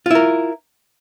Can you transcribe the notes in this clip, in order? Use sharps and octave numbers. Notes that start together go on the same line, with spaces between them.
E4 F4 A#4